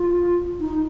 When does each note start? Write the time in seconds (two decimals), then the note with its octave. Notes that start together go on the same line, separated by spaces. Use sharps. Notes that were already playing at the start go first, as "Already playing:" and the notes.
Already playing: F4
0.60 D#4